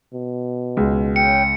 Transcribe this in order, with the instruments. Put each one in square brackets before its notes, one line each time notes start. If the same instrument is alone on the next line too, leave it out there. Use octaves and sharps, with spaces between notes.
[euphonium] B2
[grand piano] C#2
[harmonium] C#3 G5 [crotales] C#7